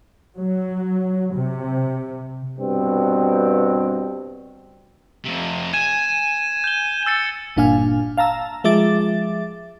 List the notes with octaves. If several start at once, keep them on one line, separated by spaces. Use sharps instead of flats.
F#3
C3
G2 B2 C4
F2 C3
G#5 G#6 D#7 E7
G6 G7
E6 A6 C#7
G1 A#2 D4 F5 G#5 F6
F5 A5 A#5 E6
F3 G#3 E5 D6 A6